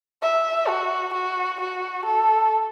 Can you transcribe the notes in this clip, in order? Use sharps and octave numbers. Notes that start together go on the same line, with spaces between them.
E5
F#4
F#4
F#4
A4